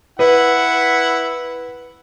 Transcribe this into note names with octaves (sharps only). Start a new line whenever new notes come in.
E4 B4 F#5